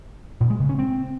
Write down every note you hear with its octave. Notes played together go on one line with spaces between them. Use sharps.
A#2
G#3
C#3
C#4
C4